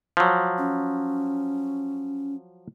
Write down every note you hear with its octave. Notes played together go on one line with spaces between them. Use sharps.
F3 F#3
C#4